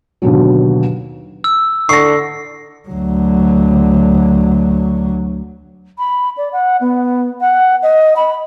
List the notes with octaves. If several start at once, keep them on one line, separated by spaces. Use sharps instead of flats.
D#2 B2 D3 F#3
E6
D3 C#6 A#6 C7
D2 F#3
B5
D5
F#5
B3
F#5
D#5
B5